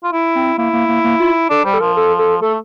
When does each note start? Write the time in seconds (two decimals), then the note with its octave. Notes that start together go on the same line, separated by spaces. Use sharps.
0.04 F4
0.12 E4
0.35 C4
0.58 A#3 E4
0.73 A#3
0.88 A#3
1.04 A#3
1.20 F4
1.50 D4 A4
1.65 G3 C5
1.74 A4
1.80 F3 A#4
1.96 A4
2.19 A4
2.42 A3 A4